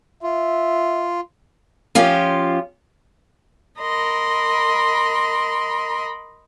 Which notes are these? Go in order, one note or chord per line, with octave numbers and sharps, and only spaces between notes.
F4 E5
F3 C#4 F4 G4
A#4 D#5 B5 C6